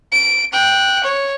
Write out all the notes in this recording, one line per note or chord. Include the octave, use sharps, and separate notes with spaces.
D7
G5 F#6
C#5